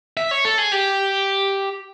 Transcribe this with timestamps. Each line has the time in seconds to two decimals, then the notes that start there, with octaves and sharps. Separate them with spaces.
0.17 E5
0.31 C#5
0.45 A4
0.58 G#4
0.72 G4